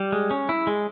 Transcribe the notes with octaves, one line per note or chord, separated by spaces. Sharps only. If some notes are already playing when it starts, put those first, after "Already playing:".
Already playing: G3
G#3
C#4
E4
G#3